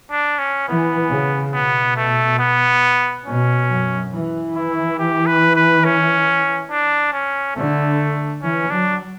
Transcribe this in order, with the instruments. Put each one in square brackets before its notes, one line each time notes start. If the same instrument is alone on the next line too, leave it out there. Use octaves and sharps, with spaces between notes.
[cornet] D4
C#4
[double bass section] E3 [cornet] B3
[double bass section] C#3
[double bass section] B2 [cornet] B3
[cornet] A3
B3
[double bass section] B2 [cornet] C#4
[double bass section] F#2
E3
[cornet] E4
G4
B4
B4
C#4
D4
C#4
[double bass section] D3 [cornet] A3
[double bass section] E3 [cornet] C#4
[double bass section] F#3 [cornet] D4